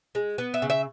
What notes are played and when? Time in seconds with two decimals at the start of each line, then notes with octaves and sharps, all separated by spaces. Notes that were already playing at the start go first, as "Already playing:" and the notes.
0.15 G#3
0.38 B3
0.54 E5
0.62 C#3
0.70 E5